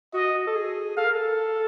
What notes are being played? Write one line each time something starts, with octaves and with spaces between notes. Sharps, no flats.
F#4 D#5
A4
G#4
A4 F5
A#4
A4